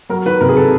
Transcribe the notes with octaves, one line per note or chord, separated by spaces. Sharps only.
F#3 A#4
D#3 B4
C3 A#4
G#4
C3 A4